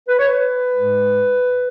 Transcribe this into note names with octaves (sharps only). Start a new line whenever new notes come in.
B4
C#5
B4
G#2 G#3